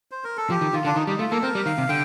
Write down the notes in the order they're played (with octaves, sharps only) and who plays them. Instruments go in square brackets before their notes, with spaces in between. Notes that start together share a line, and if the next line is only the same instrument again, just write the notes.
[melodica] C5
A#4
A4
[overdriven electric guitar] F3 [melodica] G4
[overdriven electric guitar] D#3
[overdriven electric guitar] D#3 [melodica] F4
[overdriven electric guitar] D3 [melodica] D4
[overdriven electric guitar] D#3 [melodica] D#4
[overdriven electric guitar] G3 [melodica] D#4
[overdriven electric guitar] A3 [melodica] F4
[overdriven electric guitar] A#3 [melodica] A4
[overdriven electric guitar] C4 [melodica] A#4
[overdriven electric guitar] G3
[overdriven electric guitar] D#3 [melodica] F5
[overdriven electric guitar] C3
[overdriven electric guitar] D3 [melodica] G5